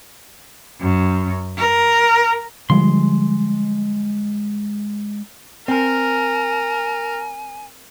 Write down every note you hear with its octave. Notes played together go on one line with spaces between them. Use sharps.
F#2
A#4
D3 F3 G3 G#3 C6
C4 A#4 G#5